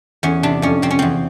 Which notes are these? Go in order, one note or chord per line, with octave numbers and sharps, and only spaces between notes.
E2 C#4
C3 D4
F2 C#4
C3 C4
C#4
E2 C4